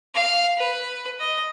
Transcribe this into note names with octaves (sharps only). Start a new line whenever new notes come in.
F5
B4
D#5